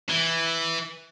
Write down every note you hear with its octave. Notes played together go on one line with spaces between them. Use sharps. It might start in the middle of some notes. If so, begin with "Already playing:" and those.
E3